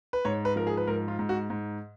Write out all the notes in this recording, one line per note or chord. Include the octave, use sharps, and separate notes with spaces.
B4
G#2 C#5
B4
F3 A#4
G#4
B4
G#2 A#4
F4
G#2
F#4
G#2